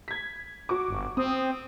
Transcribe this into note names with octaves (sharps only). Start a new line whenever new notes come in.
G#6 B6
F#4 C#6 D6
G1
C4 D#6